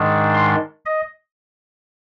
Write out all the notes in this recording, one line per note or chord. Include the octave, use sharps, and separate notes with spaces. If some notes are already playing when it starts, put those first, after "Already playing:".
Already playing: G#2 D#3 G#3 D4
C6
D#5